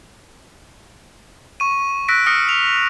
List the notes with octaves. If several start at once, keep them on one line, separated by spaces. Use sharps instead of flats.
C#6 D#7
E6 F#6 A#6 B6 D7
D#6 F6 A#6 C#7
F7